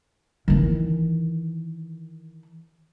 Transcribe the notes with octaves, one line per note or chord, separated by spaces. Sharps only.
D#3 E3